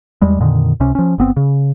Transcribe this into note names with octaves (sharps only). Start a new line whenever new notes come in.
E2 G3 G#3
F2 A#2 D3 D#3
C#2 C3 C#4
F3 C#4
G1 B3 C4
C#3